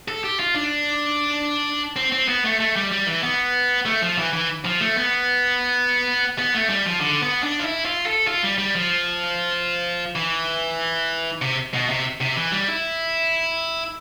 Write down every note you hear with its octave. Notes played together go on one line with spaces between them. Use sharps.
A4
G4
F4
D4
C4
C4
B3
A3
A3
G3
G3
E3
B3
A3
F3
E3
E3
F3
A3
B3
B3
A3
G3
F3
D3
B3
D4
F4
E4
F4
A4
F4
G3
G3
F3
E3
C3
B2
C3
C3
E3
G3
E4